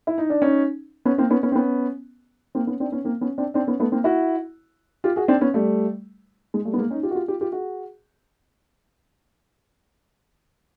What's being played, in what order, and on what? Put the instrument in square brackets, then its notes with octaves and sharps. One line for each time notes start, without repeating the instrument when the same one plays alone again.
[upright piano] E4
D#4
D4
C#4 D#4
B3 C#4
A#3 C4
B3 C#4
B3 C#4
C4
B3 C#4
A#3 C4
B3 C#4
C4 D4
B3 C#4
A#3 C4
B3 C#4
C4 D4
C4 D4
B3 C#4
A3 B3
A#3 C4
E4 F#4
F4 G4
F#4 G#4
C4 D4
B3 C#4
G3 A3
G#3
G3 A3
B3
G#3 A#3
C#4 D#4
F4 G4
F#4
F4 G4
F4 G4
F4 G4
F#4 G#4